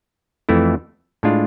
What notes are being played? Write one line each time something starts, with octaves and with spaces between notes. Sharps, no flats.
F2 E3 A3 E4
A2 G#3 D4 F4